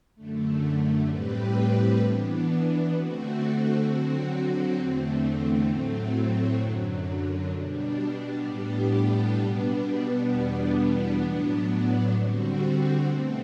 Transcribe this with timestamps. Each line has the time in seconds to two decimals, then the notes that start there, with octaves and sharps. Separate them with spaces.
0.15 F#2 D3 A3
1.07 A2 G3 C4 G4 B4
1.98 E3 B3 D4
2.90 D3 A3 C4 F#4
3.83 D3 F#3 C4 F#4
4.75 E2 D3 A3 C4
5.67 A2 F#3 A3 C4
6.59 F#2 D3 F#3
7.51 B2 G3 D4
8.43 A2 G3 B3 D4 G4
9.35 B2 G3 B3 D4
10.27 E2 B2 G3 B3 D4
11.19 A2 F#3 B3 D4
12.11 D3 G3 C4 F#4
13.03 B2 A3 C4